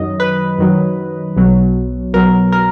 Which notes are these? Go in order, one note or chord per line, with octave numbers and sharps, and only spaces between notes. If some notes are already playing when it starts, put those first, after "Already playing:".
Already playing: F#2 D#3 F#3 D#5
B4
F#2 D#3 F#3
B1 B2 F#3
B1 B2 F#3 A#4
A#4